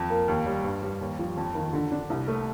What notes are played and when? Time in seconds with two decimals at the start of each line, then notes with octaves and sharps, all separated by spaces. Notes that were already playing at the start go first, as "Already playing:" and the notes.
Already playing: F2
0.10 A#3
0.28 D#2
0.46 G3
0.64 G2
0.82 G3
1.01 D#2
1.19 F3
1.37 F2
1.55 D#3
1.73 D3
1.91 D4
2.10 C2
2.28 A3